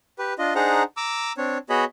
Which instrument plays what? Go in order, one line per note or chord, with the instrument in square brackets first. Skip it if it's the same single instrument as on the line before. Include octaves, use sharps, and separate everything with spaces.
[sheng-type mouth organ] G4 B4
D4 F4 D#5
D4 D#4 G#4 C5 F#5 A#5
A#5 D6 E6
C4 D4 C#5
B3 F#4 G#4 C#5 D#5 B5